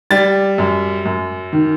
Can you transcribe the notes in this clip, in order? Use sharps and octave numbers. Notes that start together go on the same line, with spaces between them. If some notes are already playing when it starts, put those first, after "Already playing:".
G3 A6
F#2
F#2
D#3